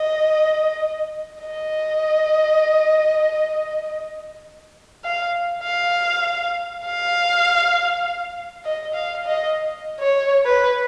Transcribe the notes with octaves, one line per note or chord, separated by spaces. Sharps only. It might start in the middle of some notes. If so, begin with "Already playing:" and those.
Already playing: D#5
D#5
F5
F5
F5
D#5
F5
D#5
C#5
B4